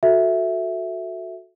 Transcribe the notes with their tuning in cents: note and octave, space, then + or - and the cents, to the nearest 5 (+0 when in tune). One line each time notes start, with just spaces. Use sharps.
F#4 -15 A4 +0 E5 +0